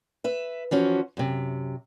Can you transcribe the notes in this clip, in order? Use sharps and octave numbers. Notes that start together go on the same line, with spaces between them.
B4 E5
E3 F3 C#4 F#4
F#2 C3